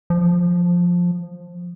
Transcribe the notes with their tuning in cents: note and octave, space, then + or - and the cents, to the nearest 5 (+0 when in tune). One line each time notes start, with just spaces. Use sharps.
F3 +10